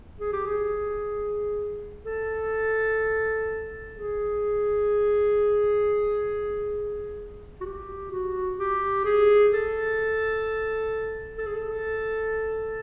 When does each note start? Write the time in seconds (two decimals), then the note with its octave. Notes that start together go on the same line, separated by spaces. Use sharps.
0.19 G#4
0.33 G4
0.46 G#4
2.06 A4
3.92 G#4
7.61 F#4
7.65 G4
8.11 F#4
8.58 G4
9.05 G#4
9.52 A4
11.38 A4
11.46 G#4
11.55 A4